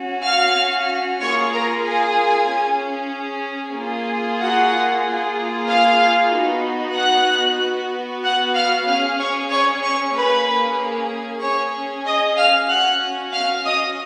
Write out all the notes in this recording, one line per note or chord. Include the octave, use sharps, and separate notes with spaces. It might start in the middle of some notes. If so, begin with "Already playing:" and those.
Already playing: C#4 F#4
F5 F6
A#3 F4 G#4 C#5 C#6
A#4 A#5
G#4 G#5
C#4 G#4
A#3 F4 G#4
F#4 F#5
A#3 F4 G#4
F5 F6
B3 D#4 F#4
F#5 F#6
B3 F#4
F#5 F#6
F5 F6
C#4 G#4 F5 F6
C#5 C#6
C#5 C#6
C#5 C#6
A#3 C#4 G#4 B4 B5
C#4 G#4 C#5 C#6
D#5 D#6
F5 F6
C#4 F#4 F#5 F#6
F5 F6
D#5 D#6